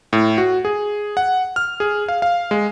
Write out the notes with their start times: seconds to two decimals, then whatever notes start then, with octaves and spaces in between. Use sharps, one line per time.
0.13 A2
0.38 F#4
0.65 G#4
1.17 F#5
1.56 F6
1.80 G#4
2.09 F5
2.22 F5
2.51 G#3